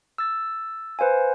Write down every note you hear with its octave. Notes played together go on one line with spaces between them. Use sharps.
E6 A6
B4 C5 F5 G#5